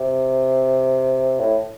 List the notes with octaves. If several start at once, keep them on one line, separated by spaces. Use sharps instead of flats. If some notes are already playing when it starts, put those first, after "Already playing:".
Already playing: C3
A2